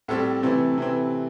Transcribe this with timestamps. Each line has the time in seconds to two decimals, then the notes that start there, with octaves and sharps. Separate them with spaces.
0.08 A2 G3 C4 A4
0.43 C3 E3 A3 C4
0.78 C3 E3 C4